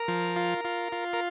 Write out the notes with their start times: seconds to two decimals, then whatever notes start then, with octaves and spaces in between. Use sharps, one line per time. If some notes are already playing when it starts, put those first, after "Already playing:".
Already playing: A#4
0.08 F3
0.36 F4
0.65 F4
0.92 F4
1.13 A#4